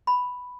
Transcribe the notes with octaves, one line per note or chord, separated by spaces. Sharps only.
B5